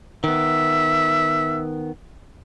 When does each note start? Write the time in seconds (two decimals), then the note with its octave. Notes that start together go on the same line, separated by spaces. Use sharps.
0.24 D#3 B3 E5